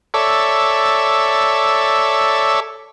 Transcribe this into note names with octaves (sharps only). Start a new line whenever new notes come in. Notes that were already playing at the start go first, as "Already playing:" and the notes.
A4 C#5 D5 E5